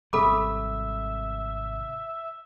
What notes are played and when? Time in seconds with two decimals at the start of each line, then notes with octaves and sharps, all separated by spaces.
0.13 G#1 C3 G3 A4 E5 B5 D6